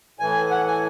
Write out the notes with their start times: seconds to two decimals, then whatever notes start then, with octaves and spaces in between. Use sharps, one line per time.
0.19 A2 E3 G#5
0.51 F#5
0.67 G#5